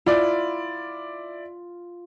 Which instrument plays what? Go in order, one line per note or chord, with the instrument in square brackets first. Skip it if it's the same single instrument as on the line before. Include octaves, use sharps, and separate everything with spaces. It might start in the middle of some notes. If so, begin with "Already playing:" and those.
[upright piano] E4 D5 [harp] F4